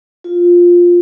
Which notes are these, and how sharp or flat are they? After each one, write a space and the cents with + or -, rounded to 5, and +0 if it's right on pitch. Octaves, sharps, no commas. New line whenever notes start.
F4 +5